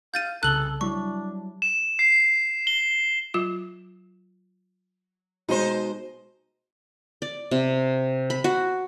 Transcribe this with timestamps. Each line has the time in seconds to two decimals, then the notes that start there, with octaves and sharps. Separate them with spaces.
0.14 F5 G6 A6 D#7
0.43 C2 C#3 A4 F#6 F#7 G7
0.81 F#3 G3 D4 E4 C#6
1.62 E7
1.99 C7
2.67 G7
3.34 F#3 F4 D6
5.49 B2 G#3 D#4 C5
7.22 D5
7.51 C3
8.30 B5
8.44 F#4